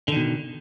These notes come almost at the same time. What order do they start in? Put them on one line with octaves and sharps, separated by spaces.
D3 D#3 B2